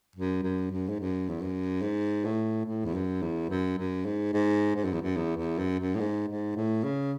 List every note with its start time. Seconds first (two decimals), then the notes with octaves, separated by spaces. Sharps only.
0.16 F#2
0.43 F#2
0.71 F#2
0.89 G#2
1.00 F#2
1.29 E2
1.41 F#2
1.82 G#2
2.25 A2
2.66 A2
2.85 E2
2.94 F#2
3.22 E2
3.49 F#2
3.78 F#2
4.05 G#2
4.33 G#2
4.75 G#2
4.84 F#2
4.93 E2
5.02 F#2
5.17 E2
5.37 E2
5.58 F#2
5.79 F#2
5.95 A2
6.00 G#2
6.28 G#2
6.56 A2
6.84 C#3